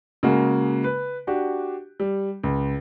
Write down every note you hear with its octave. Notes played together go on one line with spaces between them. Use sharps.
C#3 G#3 A#3 F#4
B4
D4 F#4 G4
G3
C#2